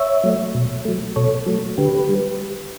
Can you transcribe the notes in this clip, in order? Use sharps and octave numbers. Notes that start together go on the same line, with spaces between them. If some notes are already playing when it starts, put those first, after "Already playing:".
Already playing: C#5 E5
F#3 A3
B2
F#3 A3
B2 A4 C#5
F#3 A3
D3 G4 B4
G3